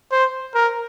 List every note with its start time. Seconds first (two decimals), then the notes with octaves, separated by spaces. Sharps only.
0.12 C5
0.55 A#4